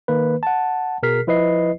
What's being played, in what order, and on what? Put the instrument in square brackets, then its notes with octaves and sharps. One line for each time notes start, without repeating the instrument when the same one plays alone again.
[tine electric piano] D#3 A#3 B4
F#5 A5
B2 G#4 A#4 F6 B6 C7
F3 E4 B4 D#5 C7